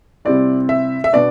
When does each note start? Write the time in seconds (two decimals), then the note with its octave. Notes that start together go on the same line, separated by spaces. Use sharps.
0.25 C3 G3 C4 E4 D5
0.69 E5
1.04 E5
1.13 B2 B3 D4 D5